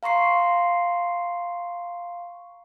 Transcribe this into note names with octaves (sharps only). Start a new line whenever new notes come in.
F5 A#5 C6 C#6 C7